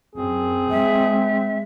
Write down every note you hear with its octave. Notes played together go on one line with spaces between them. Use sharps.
F#2 C4 G#4
G#3 E5